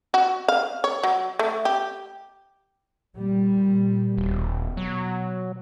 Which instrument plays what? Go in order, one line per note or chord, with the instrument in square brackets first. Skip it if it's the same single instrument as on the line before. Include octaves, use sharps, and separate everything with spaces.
[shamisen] F#4
F5
C#5
F#3
A3
G4
[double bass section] A#2 G3
[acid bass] D#1 [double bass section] B2
[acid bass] F#3